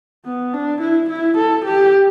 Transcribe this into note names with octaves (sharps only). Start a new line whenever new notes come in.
B3
D4
E4
E4
A4
G4